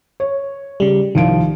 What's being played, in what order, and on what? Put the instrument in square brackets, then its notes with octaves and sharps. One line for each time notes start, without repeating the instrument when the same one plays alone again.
[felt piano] C#5
[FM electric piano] C#3 G3
[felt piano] C2 F3 D7 [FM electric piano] D#3